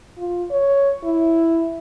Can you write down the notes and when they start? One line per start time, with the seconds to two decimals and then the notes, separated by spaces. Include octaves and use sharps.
0.18 F4
0.51 C#5
1.05 E4